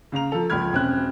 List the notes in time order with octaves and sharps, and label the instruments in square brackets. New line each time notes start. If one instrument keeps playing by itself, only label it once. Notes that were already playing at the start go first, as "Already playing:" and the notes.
[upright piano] C#3 F5 A#5 F7
F3 A4
C#2 F3 B5 F6 G#6
E1 C4 C#4 F#6